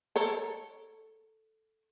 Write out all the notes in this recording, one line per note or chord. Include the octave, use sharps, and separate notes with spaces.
A4 A#4 C#5